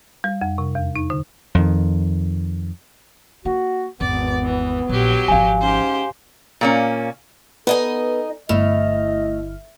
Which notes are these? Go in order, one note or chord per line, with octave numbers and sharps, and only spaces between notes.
G3
F2
C3
E2
D#4
D3
F2 D#3
A#3 F#4
G#1 E2 B3 D5
E3
A#1 F#3 G4
G#1 F3 F5 G#5
G#2 C#4 G4 C5
A#2 A#3 C#4
B3 D#4 A4 D#5 G#5
G1 A3 E4 D#5 F6